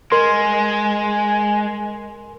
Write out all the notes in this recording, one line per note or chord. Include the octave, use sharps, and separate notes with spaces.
G#3 A#4 C6